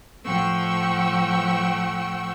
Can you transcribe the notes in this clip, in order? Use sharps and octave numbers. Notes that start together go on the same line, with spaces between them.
A2 F3 F#5 G5 C#6 E6